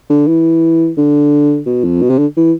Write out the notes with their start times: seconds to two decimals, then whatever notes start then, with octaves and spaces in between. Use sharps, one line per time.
0.10 D3
0.27 E3
0.97 D3
1.66 B2
1.84 F2
2.02 B2
2.10 C3
2.18 D3
2.37 E3